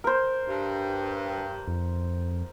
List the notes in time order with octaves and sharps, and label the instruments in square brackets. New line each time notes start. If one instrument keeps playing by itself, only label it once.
[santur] A#4 C5
[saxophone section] G2
[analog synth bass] F2